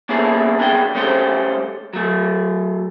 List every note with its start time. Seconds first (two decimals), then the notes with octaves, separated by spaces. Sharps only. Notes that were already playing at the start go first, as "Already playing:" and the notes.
0.09 A#3 B3 C#4 E4 G#4 A4
0.57 C2 B3 D4 G#4 G5
0.95 G#3 A3 C#4 G4 C5
1.93 F#3 A3